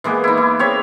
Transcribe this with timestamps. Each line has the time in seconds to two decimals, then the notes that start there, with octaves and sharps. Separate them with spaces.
0.04 E3 G#3 A#3 B3
0.24 D#4 E4
0.37 E4
0.59 C4 C#5 E5